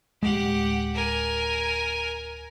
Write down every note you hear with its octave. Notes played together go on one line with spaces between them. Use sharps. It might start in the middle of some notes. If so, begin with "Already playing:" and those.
D1 G#3 G4 F#5
A#4 G#5